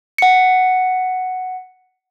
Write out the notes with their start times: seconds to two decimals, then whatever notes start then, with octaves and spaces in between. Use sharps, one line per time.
0.18 F#5 C#7